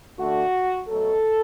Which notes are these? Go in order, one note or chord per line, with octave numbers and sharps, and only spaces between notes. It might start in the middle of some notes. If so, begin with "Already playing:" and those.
D3 A3 F#4
B2 F#3 A3 A4